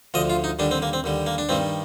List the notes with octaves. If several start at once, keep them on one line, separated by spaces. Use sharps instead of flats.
D2 D3 F3 D#5
F4
D#4
D#2 D3 G3 D4
C4
A#3
C4
D#2 D3 G3
A#3
D4
G2 D#3 G3 C4